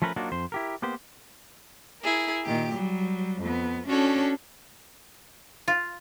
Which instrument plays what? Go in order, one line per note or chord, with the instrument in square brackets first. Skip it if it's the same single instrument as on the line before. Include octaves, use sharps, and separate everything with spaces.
[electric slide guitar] F3 A3 C#4 A#4 B4
F#3 A#3 D4 D#4 F4 F#4
F2 C5
E4 G4 A#4
A#3 B3 G4 C5
[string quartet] E4 G#4 A#4
A#2 D#3 G4
F#3 G3
F2 B3
C#4 D4 F#4 A4 C#5
[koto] F4